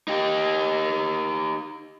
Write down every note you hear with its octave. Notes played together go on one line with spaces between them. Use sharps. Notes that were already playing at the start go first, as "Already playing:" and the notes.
D#4 G4